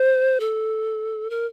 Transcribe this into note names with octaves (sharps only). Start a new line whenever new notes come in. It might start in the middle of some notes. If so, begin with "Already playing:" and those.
Already playing: C5
A4
A#4